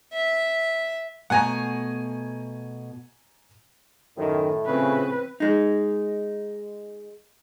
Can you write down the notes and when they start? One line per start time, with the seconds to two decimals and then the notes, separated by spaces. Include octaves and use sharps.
0.13 E5
1.30 B2 A3 F#5 G#5 A#5
4.17 F#2 A2 D#3
4.66 A#2 C#3 C4 B4
5.40 G#3 D#4